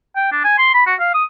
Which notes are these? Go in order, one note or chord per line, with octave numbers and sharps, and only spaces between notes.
G5
D4
G#5
C6
B5
F#4
F5
D#6